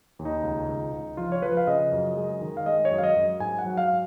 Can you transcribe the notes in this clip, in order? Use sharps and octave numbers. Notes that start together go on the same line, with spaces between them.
D#2
D#4
C#2
C#2
C#2
F3 F4
C#5
F3 B4
F5
C#3 D#5
F#2
G#3
D#3
F5
G#3 D#5
C#5
F#2
F5
D#5
F#2
G#2 G#5
F#5
F#3
F5